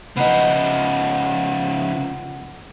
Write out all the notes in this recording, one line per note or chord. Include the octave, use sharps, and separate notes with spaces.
C#3 F3 B3 D#4